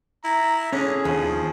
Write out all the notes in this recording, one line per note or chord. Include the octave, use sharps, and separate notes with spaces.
E4 A#5
D3 C#4 G#4
D#2 F3